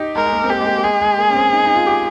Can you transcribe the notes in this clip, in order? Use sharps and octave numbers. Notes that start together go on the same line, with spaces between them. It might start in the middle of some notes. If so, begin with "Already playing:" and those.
Already playing: D#4 G4
G#3 A#4
G#3
A#3
C4
A#3 G4
G#3
A#3
A#3
G#3 G#4
G#3
A#3
C#4
C4
D#4
D#4
F4
G4